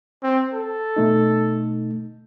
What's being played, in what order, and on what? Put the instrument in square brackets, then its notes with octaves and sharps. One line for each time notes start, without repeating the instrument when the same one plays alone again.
[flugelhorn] C4
A4
[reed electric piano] B2 A3 D#4